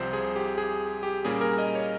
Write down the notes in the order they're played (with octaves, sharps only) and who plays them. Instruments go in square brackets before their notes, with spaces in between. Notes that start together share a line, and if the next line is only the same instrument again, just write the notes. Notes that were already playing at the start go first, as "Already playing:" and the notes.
Already playing: [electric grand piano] C2 C3 F3 C4 C5
G#4
G4
G#4
G4
A#2 G3 A#3 C#4 G#4
A#4
D#5
C#5